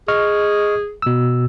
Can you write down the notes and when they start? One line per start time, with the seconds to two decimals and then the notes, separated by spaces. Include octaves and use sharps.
0.08 G#4 D#5 C#6 F6
1.02 B2 E6